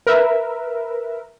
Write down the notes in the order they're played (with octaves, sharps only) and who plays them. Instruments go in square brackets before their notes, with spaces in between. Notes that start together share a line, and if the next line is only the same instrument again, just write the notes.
[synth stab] A#4 B4 E5